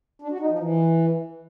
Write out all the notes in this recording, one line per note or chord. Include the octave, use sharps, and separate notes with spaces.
D4
F#4
D#4
F3
E3